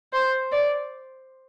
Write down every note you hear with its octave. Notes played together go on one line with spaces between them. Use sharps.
C5
D5